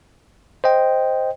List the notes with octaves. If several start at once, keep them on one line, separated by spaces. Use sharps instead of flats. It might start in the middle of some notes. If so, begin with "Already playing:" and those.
C5 D#5 G5